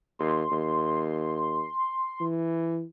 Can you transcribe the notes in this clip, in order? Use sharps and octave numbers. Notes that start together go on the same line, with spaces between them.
D#2 C6
D#2
E3